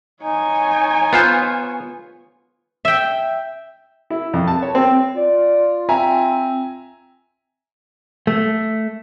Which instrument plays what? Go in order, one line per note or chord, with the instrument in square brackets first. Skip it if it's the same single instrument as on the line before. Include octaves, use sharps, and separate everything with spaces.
[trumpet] D#4 [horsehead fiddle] C#5 G#5
[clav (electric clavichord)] B3 F4 C5
[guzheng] E5 G5
[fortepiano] E4
F2
A5
C#5
C4
[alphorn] F4 [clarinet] D5
[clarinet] C4 [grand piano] E5 G#5 A#5
[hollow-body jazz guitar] A3